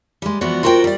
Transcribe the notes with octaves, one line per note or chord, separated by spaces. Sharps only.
G3 G#3
E3 F3 B3 F#4 D5
F4 F#4 A#4 C5 G5
G3 D5